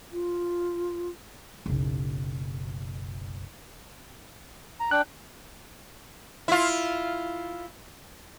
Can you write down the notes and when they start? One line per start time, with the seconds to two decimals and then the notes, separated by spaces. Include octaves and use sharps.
0.12 F4
1.66 F#1 B1
4.80 A#5
4.91 D4 G5 F#6
6.48 E4 F4